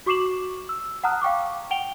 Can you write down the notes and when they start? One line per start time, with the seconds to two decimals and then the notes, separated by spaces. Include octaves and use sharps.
0.06 F#4 C#6 D6 C7 E7 F#7
0.69 E6
1.04 F#5 A5 A#5 D#6 F6 F#6
1.22 F5 G5 C#6 D6
1.70 F#5 G5 D7 F7 G7